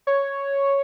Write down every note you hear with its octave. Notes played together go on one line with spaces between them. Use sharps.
C#5